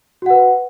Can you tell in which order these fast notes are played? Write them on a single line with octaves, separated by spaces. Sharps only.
F#4 F#5 B4